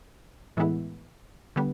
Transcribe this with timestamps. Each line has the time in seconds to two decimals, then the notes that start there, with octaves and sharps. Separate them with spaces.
0.57 A2 E3 G#3 B3 E4
1.56 D3 G3 B3